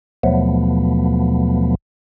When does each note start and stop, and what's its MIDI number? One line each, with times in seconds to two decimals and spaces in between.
0.23 1.75 39
0.23 1.75 47
0.23 1.75 53
0.23 1.75 54
0.23 1.75 57
0.23 1.75 59